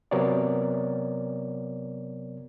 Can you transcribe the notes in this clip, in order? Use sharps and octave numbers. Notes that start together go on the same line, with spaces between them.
C3 F#3 B3 A#4 C#5 D5